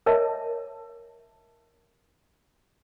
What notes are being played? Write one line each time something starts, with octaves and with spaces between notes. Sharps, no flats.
A#4 C#5 D#5 E5 A5